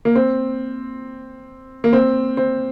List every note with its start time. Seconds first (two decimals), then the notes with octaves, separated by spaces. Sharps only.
0.05 A#3
0.15 C4
1.84 A#3
1.93 C4
2.37 C4